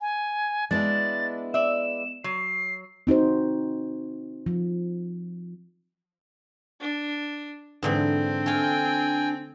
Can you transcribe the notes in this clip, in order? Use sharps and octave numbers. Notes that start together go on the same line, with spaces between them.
G#5
G#3 B3 D4 E4 A6
D5 E5 E7
F#3 C7
C4 D#4 F#4 C5
F3
D4
G#2 D3 E3 C4 D4
A3 F5 G5 G#5